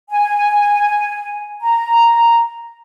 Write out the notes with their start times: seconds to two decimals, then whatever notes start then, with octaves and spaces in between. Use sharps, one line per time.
0.11 G#5
1.61 A#5